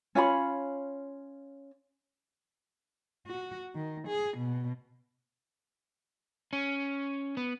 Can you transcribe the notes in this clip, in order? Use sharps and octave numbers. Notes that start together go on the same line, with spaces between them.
C#4 F4 C#5 B5
F#4
D#3
G#4
B2
C#4
B3